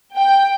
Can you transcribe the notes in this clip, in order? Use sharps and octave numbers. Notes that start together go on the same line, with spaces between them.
G5